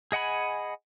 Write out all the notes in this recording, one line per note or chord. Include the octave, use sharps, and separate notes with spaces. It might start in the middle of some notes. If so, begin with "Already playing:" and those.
G#4 D#5 F#5 G#5 B5